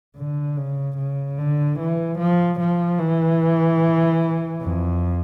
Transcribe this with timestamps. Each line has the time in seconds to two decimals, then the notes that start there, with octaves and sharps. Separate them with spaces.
0.16 D3
0.57 C#3
0.97 C#3
1.38 D3
1.79 E3
2.18 F3
2.60 F3
2.99 E3
4.62 F2